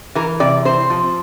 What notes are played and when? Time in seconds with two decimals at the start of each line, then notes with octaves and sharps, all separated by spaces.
0.15 E3 A#4
0.40 C3 D5
0.65 C4 C5
0.90 F3